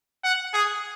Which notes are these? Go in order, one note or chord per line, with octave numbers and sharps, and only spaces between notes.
F#5
G#4